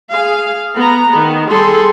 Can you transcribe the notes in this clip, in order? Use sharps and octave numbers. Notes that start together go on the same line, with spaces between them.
G#4 F5
B3 A#5
D#3 B3
G3 G#4 A4 C6